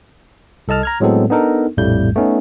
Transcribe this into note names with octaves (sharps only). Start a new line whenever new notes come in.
C2 A4 D#5 A5 F6
A#5 F6 G#6
A2 F#3 G#3 B3 C4 A4
B3 D4 D#4 A4 A#4
A#1 F2 A2 G3 A3 G6
A3 B3 C#4 D#4